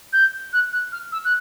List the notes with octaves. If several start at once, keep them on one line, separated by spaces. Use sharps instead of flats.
G6
F#6
F#6
F6
E6
F#6